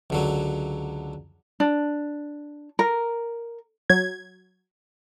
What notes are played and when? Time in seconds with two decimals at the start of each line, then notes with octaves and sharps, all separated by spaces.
0.10 C#2 D3 F#3
1.60 D4
2.79 A#4
3.90 F#3 G#6